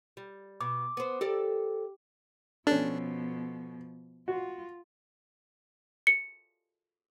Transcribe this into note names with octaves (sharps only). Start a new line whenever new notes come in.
G3
B2 D6
B3 C5
G4 A4 A#4 D5
B2 F3 C#4 D4 A4
F4 F#4
C#7